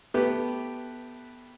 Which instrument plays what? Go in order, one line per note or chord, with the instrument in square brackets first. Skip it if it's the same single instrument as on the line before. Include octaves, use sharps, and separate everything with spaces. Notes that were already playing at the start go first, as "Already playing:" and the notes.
[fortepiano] A3 B3 G4 B4